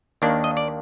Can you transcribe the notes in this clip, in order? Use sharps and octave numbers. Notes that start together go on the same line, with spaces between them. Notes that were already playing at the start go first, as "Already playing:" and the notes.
D#2 D#3 A#3 D4 D5
D#5
D5